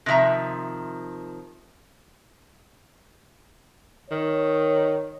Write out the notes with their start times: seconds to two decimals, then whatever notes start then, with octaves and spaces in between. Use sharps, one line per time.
0.06 C3 D#3 F3 E5 A#5
4.11 D#3 C#5